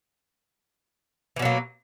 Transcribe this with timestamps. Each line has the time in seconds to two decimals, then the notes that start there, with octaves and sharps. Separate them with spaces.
1.36 E3
1.39 B2
1.42 F#3
1.45 A#3